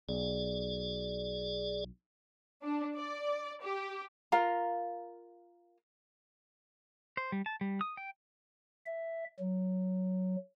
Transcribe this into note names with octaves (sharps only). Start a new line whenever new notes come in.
B1 G#4 D5
D4
D5
G4
F4 A#4 F5 A#5
C5
G3
A5
G3
D#6
G5
E5
F#3